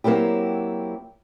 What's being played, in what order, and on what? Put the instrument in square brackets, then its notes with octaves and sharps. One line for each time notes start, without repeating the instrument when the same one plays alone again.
[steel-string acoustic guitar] F#3 A#3 C4 E4 G4